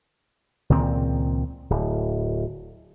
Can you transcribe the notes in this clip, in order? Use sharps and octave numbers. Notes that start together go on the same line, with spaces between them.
C#2 A#2 D#3 C4
D1